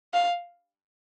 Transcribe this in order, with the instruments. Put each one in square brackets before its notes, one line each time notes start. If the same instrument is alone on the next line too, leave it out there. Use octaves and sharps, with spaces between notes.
[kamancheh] F5